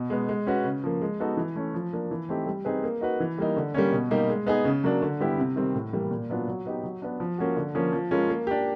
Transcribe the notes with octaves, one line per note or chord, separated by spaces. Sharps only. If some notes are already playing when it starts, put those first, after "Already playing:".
Already playing: B2
G#3 B3
G#3
C#4 F#4 B4
C#3
F3 A#3
G#3
B3 D#4 F#4 A4
E3
A3 C#4
F3
A#3 D4
E3
A3 C4 D#4 G4
G3
C4 D#4 G#4 B4
A#3
D#4 F#4 B4
E3
G3 A#3 D#4
D3
G3 A#3 C#4
B2
G3 A#3 D#4 G4
G#3
B3 D#4 G#4
C#3
F#3 A#3 D4
D3
G3 B3 E4 G4
C3
D#3 G3 C4
A2
E3 G3 A#3
A#2
F#3 B3 D4 F4
F#3
B3 D#4 G4
F#3
B3 D4
F3
A#3 C#4 F#4
D3
F3 A#3 C#4
F3
G#3 C#4 F4 A#4
A#3
D4 G4